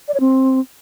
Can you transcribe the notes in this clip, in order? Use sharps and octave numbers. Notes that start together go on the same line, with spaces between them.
D5
C#5
C4